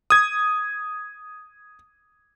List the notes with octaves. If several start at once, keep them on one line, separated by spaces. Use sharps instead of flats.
D#6 G#6